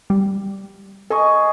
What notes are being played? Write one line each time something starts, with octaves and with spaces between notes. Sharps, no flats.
G3
G#4 A4 D#5 C#6